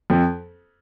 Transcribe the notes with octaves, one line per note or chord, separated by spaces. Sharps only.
F2